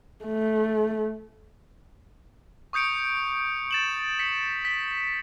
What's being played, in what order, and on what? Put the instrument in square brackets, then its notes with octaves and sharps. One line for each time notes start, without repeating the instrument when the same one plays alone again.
[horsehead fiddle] A3
[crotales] C#6 D#6 G6 C#7 D7
A6 E7 F#7
B6 C#7
B6